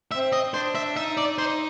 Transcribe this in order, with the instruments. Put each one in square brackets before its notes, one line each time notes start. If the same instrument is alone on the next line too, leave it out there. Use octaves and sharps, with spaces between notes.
[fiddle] C4 [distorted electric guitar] E5
[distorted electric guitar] D#5
[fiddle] D4 [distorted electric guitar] C5
[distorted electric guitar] E5
[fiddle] D#4 [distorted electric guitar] E5
[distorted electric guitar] D5
[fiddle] D#4 [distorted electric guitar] C5